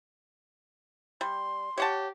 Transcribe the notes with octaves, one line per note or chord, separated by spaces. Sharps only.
G3 C6
G4 C#5 F#5 A5